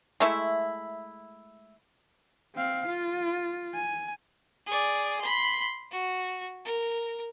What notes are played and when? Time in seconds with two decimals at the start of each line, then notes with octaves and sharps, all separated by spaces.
0.20 G#3 A3 E4
2.55 C4 F5
2.87 F4
3.75 G#5
4.67 G#4 D5
5.21 B5 C6
5.92 F#4
6.65 A#4